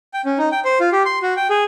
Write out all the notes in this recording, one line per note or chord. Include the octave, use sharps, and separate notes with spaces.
G5
C#4
D#4
G5
C5
F4
G4
C6
F#4
G5
G#4